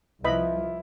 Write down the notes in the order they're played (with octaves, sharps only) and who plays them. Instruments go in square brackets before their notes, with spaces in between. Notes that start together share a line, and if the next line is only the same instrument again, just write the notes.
[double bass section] C2 F3 [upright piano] E4 [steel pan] B4 D#5 B5